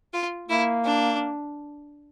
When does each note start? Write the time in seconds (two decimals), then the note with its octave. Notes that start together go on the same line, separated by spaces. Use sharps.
0.14 F4
0.48 A#3 E4
0.85 D4